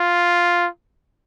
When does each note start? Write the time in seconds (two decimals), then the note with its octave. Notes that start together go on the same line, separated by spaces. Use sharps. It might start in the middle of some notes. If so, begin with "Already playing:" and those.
Already playing: F4